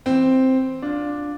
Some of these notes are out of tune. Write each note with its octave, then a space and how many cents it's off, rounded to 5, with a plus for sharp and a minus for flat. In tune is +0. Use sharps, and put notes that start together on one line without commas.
E3 +5 C4 +0 G5 +0
D4 +0 F4 +20